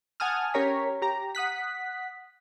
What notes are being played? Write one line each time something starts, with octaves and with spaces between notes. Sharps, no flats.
F#5 G#5 A5 D#6 F6
C#4 G4 A#4 C#5 A#5 B6
G4 A#5
F#5 D#6 F#6 B6